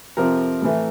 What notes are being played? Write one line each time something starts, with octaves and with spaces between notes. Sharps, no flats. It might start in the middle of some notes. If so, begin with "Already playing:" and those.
F2 C3 F3 A#4
A2 E3 A3